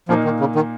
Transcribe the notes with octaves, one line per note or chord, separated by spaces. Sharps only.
A#2 F3 A#3 D#4
D#3
C#3
D#3